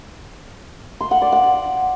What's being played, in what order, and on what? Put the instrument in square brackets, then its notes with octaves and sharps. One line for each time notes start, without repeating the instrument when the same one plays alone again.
[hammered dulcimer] C6
F#5
D5
F#5